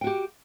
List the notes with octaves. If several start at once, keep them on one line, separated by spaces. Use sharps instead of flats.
F#4 G4 G5